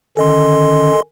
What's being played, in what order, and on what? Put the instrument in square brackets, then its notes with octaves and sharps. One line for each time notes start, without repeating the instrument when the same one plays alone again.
[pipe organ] D3 D#3 C#4 [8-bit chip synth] A4 D#5 C6